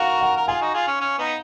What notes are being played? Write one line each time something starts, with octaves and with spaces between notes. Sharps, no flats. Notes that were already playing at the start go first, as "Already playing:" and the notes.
Already playing: F#4 A#4 F5 F#5
F#5
A#4
F4 G#4 G#5
D#4 F#4
F4 G#4
C#4
C#4
B3 D#4